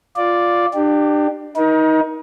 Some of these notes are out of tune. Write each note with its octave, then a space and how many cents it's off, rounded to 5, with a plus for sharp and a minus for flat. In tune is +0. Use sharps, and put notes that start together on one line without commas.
F4 +0 D5 +0
D4 +30 G4 +0
D#4 +20 A#4 +40